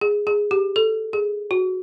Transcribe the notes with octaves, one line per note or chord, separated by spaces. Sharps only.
G#4
G#4
G4
A4
G#4
F#4